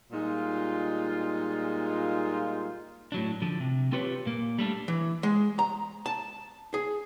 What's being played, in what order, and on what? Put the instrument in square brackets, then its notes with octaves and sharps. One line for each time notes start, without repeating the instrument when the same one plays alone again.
[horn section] A#2 G3 G#3 D#4 F4
[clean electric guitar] A2 F#3 D4
D3 F3
C3
C4 F4 G4 B4 C#5
A#2 A#3
G3 A3 D4
[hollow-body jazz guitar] E3
G#3
A#5
A5
G#4